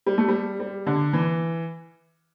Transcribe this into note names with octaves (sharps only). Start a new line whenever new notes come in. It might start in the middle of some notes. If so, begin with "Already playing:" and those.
G3
A3
G3
G3
D3
E3